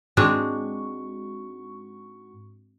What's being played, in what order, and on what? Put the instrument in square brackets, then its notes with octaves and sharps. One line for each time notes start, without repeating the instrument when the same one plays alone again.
[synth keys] G#2 F#4 C#6 [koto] G#3 C4 D4